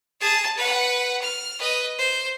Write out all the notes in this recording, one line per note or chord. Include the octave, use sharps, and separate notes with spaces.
G#4 A5
B4 F#5
F6
B4 D#5
C5